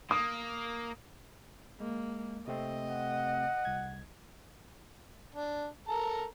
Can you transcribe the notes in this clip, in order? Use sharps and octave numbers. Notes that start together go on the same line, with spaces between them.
A#3 D#6
G#3 A#3
C3 A3 C4 D#5
F#5
C2 G#6
D4
A4 A#4 A#5